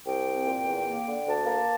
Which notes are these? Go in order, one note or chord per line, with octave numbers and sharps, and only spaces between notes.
C2 G5
C4
A#2
E2
A#3
D3
D2 A5
A#3